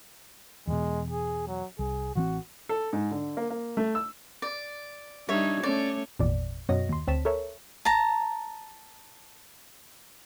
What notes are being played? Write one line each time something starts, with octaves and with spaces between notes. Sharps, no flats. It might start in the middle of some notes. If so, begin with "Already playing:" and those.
E2 B2 G#3
G#4
F#3
C2 G#4
A1 E3 C4 F#4
A4
G#2
D3
A#3
A#3
A3
E6
D5
G3 D4 D#4 C#5 E5
A3 C#4 C#5 D5
G#1 E2 A#2 D5
F#2 B2 F#4 C#5 D#5 A#6
D#2 C6
D2 C4 C#5 A5 B6 E7
A4 A#4 C#5 E5
A5 A#5